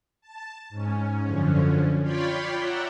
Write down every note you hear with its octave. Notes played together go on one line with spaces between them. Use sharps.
A5
G#2 C#4
F#2 D3 F3 C#4
F4 C#5 D5 G5 B5 C6
D5 E5 F#5 G5 A#5